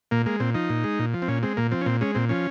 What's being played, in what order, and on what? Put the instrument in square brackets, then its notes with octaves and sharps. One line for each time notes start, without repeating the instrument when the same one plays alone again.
[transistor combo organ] A#2 A#3
G#3 A#3
A#2 C4
F3 D#4
A#2
G#3
A#2
F3
C4
A#2 C#4
G#3 C4
A#2 A#3
F3 C4
C#4
A#2 C4
G#3 C#4
A#2 C4
F3 C#4